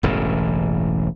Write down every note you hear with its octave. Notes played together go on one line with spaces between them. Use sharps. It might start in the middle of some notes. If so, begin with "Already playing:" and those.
E1 A1 G2 C#3